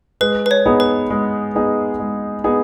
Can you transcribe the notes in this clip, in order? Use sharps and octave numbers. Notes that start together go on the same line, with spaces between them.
G#3 B4
B4
C#5
B3 D#4 G#4
B4
G#3
B3 D#4 G#4
G#3
B3 D#4 G#4